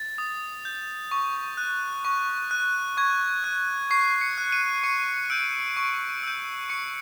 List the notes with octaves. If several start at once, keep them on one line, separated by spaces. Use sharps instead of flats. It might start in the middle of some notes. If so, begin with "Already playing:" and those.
Already playing: A6
D#6
G6
C#6
F#6
C#6
F#6
C#6 G#6
F#6
C#6 C7
C#7
F#6
D#7
C#6 C#7
E6 G6 D7
C#6 D7
E6 G6
C#6 C#7